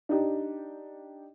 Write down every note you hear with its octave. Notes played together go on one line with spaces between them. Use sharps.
D4 D#4 G4